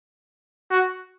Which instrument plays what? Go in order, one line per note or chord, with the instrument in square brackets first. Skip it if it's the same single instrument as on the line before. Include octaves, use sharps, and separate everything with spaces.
[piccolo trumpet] F#4